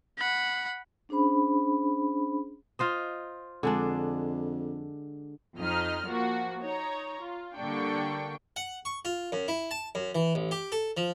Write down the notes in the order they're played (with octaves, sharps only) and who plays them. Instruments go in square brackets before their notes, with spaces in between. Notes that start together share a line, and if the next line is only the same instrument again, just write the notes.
[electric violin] F#5 B5
[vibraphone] C#4 D4 G#4 C5 B5
[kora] F4 C5 D#5
[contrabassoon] F2 [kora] D3 G#3 D4
[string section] F2 D#4 D#5 F6
F3 A#3 F#4
D#4 C#5 A#5
F4
D3 G3 A#3 D4 G5 C#6
[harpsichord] F#5
C#6
F4
F#2
E4
A5
F#2
E3
A1
G4
A4
F3